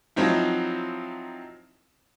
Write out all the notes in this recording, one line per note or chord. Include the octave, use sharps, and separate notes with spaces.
F3 F#3 C4 D#4 E4